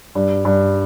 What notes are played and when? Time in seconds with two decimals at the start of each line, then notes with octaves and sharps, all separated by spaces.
0.15 G2
0.45 G2